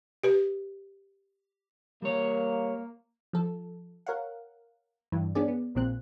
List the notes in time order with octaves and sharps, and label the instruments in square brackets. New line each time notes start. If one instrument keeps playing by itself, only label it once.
[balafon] G4 B4
[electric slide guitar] G3 C#5 [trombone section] A#3
[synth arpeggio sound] F3 A4
A#4 C#5 F5 F#5
G2 E3
B3 C#4 D4 G#4 D5
B3
A#1 A#2 C4 F#6